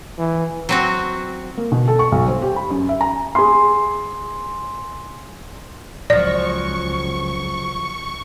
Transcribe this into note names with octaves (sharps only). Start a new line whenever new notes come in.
E3
F#3 C4 F#4
A#3
B2
A4
C#6
B1
C5
G4
B5
F#2
E5
A#5
G#4 C6
C#2 F3 F#3 D5 C#6